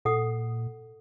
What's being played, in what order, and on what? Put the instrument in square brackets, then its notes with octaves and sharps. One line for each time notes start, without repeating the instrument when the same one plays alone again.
[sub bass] A#2 [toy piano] A4 F#5 D#6